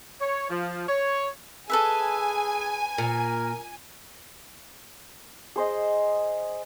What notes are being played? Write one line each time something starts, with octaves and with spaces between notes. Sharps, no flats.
C#5
F3
C#5
G#4 A4 B4 E5 G#5
A#2 A#4
G#4 C5 D#5